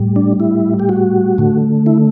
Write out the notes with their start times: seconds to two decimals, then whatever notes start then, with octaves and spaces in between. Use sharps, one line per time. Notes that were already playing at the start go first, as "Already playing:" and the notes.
Already playing: A2 G3
0.16 D4
0.40 E4
0.79 G4
0.89 F#4
1.38 D3 A3
1.86 E4